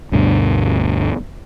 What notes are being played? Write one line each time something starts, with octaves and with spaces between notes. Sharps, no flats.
D2 G2 B2 D3